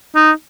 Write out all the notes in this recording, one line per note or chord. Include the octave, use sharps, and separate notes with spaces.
D#4